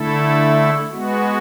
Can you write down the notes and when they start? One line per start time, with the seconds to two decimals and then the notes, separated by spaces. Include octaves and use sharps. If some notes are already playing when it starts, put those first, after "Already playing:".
Already playing: D3 A3 E4 A4
0.91 G#3 B3 F#4